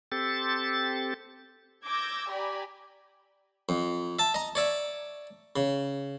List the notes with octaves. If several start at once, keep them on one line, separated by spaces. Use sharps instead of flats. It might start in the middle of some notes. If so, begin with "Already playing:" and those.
C4 G4 A4 A6
D6 E6 G6 G#6 A#6
G4 D5 G#5 A#5 B5
F2
E5 A5
D#5 A#5
C#5 D5 E5
C#3